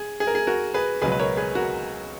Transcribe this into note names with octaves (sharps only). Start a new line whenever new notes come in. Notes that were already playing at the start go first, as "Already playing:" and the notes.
Already playing: G#4
G#4
A#4
G#4
F#4 A#4
G#4 B4
C#2 B2 F#3 G#4 B4
B4
A#4 C#5
G#4 B4
F#4 A#4